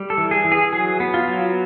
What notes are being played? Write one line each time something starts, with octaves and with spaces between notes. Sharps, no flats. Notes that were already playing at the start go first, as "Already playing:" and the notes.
Already playing: G3
A4
E3
G#4
E3
G#4
F#3 G#4
B3
F4
F#3